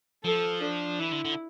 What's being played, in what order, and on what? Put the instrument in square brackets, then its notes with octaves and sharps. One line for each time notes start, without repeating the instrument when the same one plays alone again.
[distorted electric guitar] F3 [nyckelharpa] A4
[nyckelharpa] D4
[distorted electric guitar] E3 [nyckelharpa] E4
[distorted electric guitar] D3
D3